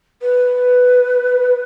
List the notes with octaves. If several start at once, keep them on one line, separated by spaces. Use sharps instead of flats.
B4